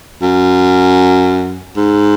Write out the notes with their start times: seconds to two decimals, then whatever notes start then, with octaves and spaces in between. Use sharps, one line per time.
0.22 F#2
1.76 G#2